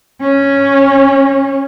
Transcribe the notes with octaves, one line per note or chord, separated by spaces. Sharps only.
C#4